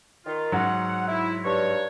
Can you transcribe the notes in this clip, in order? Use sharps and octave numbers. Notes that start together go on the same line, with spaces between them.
D#3 F4
G#2 F#3 F#5
E4
G2 C#5